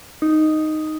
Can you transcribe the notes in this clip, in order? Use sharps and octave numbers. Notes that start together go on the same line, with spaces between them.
D#4